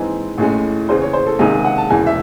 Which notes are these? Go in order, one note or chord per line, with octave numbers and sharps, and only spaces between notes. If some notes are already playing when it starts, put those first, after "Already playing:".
Already playing: G#2 E3 C4 G#5
A1 A2 G#3 C#4
E2 C#3 E3 C5
C#5
C5
A4
C#2 C3 D#3 G#4
G#4
F#5
A5
E1 E2 C#3 G#5
E5